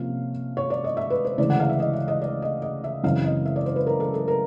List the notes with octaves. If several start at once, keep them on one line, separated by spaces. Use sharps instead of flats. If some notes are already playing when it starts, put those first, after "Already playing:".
Already playing: C3 F3 A#3 C#4 F5
C#5
D5
D#5
E5
B4
C5
D2 C#3 E3 G#3 D5
F#5
F5
E5
D#5
E5
D#5
D5
D#5
D#5
E5
F#2 C#3 E3 G#3 C4 F5
D#5
E5
D5
C5
B4
A#4
A4
A4
A#4